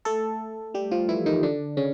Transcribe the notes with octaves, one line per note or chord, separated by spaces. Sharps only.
A3 A4
G3 G4
F3 F4
E3 E4
D#3 D#4
D3 D4
C#3 C#4